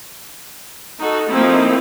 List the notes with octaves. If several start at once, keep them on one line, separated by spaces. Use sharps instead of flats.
D#4 F#4 A4
F3 A3 A#3 C4 D#4 E4